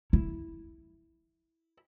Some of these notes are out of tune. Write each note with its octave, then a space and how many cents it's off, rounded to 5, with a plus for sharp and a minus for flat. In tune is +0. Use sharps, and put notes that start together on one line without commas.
E4 -10